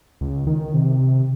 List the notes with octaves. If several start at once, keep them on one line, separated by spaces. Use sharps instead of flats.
C#2
D#3
C3